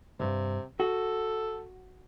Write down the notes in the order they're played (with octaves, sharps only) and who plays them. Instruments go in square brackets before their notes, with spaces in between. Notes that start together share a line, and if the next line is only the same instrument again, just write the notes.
[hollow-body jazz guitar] C2 G2 [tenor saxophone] C3
[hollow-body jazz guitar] F#4 [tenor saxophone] A4